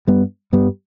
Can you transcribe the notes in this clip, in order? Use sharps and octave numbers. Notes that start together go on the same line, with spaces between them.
G2 G3 B3
G2 G3 B3